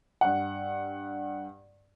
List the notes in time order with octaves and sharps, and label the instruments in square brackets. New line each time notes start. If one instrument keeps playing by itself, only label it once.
[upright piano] G2 F#5